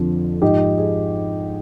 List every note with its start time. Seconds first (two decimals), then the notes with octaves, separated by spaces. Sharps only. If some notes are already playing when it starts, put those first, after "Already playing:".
Already playing: F2 D3 F3
0.42 G#2 F3 D#4 G4
0.78 G#4